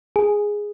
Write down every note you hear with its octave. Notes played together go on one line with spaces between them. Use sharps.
G#4